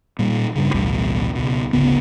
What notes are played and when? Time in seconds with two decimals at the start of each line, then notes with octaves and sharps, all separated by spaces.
0.19 A#2 G3
0.55 G2 C#3
0.74 A1 D2 B2 G3
1.35 C#2 B2
1.73 G#1 D2 C#3 B3